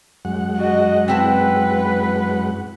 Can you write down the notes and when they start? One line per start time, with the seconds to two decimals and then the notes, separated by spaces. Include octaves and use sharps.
0.25 F#2 G#3 F#5
0.57 F#4 D#5
1.08 C4 E4 B4 A5